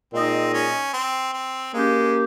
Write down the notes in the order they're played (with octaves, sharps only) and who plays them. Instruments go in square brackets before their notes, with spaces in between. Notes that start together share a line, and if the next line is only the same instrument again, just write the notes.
[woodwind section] A#2 G#3 D#4 G#4 D#5 [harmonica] C4
[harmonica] C#4
C4
C4
[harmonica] G#3 [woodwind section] A#3 C#4 G4